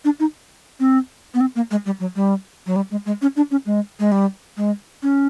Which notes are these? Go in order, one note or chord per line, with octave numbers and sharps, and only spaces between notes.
D4
D#4
C4
B3
C4
A#3
G#3
G3
F#3
G3
F#3
G3
G#3
G#3
C#4
D4
C#4
G#3
G#3
G3
G#3
C#4